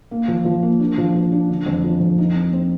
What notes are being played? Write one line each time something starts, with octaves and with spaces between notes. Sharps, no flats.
A#3
F3
F3
A#3
D4
F3
F3
D4
D3
F2
F3
F2
D#4
C4
C4